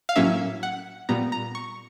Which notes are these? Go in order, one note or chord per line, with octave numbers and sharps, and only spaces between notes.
F5
A2 F#3 A#3 C#4 E5
F#5
A#2 G3 B3 A#5
A#5
C#6